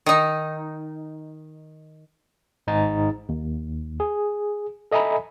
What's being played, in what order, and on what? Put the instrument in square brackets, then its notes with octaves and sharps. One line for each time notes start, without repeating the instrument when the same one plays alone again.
[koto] D#3 D#4
[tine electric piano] G#1 G#2 D#4 A#5 A6
D#2
G#4
A4 D#5 E5 G#5 A#5 B5